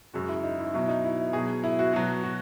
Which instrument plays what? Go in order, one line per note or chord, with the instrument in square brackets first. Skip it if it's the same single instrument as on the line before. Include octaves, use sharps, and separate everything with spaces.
[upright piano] F#2 C#3 G#3 F#4
E4
D#4
E4
B2 F#3 E4
D#4
E4
B2 F#3 G#4
E4
F#4
B2 F#3 F#4
F#4